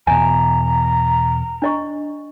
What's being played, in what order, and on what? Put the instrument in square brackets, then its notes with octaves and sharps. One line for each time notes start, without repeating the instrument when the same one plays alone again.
[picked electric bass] E2 B2 [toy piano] G#5 [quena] A#5
[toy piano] D4 D#5 C#6